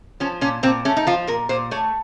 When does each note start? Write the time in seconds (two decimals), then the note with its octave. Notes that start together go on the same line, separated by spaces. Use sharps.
0.20 F3 C#4
0.41 A#2 C#4
0.63 A#2 C4
0.85 A3 C#4
0.97 D#4
1.07 F3 F4
1.27 A#2 A#4
1.49 A#2 C5
1.71 A3 C#5